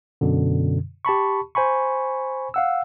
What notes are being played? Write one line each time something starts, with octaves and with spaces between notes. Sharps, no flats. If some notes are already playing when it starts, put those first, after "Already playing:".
F#2 B2 D3
G4 A5 B5 C#6
C5 G#5 B5 C#6
F5 F#5 E6